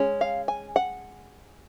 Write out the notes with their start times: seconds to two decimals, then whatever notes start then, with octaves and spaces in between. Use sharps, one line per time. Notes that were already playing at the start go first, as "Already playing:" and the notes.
Already playing: G#3 C#4
0.21 F5
0.48 G#5
0.76 F#5